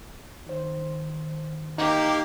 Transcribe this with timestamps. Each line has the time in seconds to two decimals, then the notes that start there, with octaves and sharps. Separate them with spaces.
0.47 D#3 C5
1.78 A#3 D#4 G4